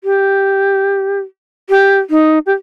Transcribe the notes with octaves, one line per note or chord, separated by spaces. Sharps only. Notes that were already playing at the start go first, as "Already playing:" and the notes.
G4
G4
D#4
G4